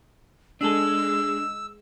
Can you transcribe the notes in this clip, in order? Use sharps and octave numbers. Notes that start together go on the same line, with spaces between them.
G#3 D4 G#4 A4 E6